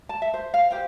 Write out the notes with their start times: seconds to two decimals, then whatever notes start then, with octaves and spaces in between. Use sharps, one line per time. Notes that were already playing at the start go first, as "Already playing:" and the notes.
0.09 A5
0.22 E5
0.34 C5
0.54 F5
0.71 G4 C5 G5